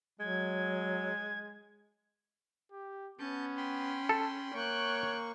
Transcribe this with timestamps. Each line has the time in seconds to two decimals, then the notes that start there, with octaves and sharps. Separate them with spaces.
0.20 F#3 G#3 G#6
2.72 G4
3.19 B3 C#4 A5 G6
3.57 G5 B5 C6
4.09 A4
4.54 A#3 C#5 G5 C#6 F#6